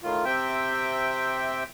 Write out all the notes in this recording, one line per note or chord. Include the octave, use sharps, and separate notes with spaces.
A2 D#3 F4
C3 C4 E5 G5